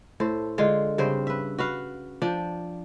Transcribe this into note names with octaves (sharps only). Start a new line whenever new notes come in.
A2 A4 C5
D3 G#3 F4
G2 C#3 C4 C5
B4 E5
F#4 B4 F5
F3 D4 G5